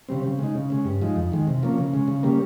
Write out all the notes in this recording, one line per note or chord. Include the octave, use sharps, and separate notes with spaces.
C#3 G3 C4
C#3
G#3 D#4
C#3
G#3 C#4
G2
F3 G#3 D#4
F2
D#3 G#3
C3
F3 A#3 C#4
C#3
G#3 C#4
C#3
G3 A#3 C#4